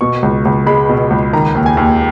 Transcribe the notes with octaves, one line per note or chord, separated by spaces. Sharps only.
B2 C#6
C#2
C#2
G#3 B5
B2
C#2
D#3 A#5
D#2
G#5
D#2